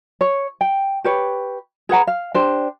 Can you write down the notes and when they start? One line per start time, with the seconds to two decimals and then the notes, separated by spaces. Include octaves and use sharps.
0.21 C#5
0.61 G5
1.04 G4 B4 C#5
1.89 G#4 B4 F#5 A#5
2.07 F5
2.34 D4 G4 C5